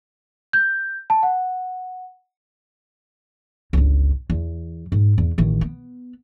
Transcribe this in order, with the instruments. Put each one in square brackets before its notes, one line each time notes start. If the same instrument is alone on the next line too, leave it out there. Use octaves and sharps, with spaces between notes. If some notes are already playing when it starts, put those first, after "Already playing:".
[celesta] G6
A5
F#5
[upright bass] G1 C#2
E2
G#2
E2
A1 D#3
B3